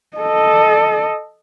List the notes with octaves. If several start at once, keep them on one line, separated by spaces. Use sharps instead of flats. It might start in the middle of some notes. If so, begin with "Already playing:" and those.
A4 D#5